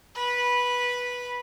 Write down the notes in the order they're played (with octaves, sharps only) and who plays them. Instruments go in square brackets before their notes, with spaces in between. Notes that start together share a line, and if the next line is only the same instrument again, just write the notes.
[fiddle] B4 B5